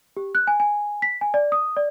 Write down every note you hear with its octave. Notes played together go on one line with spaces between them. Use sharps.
G4
F#6
G#5
G#5
B6
G#5
D5
D#6
D5